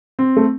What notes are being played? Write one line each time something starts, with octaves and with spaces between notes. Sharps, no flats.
C4
A3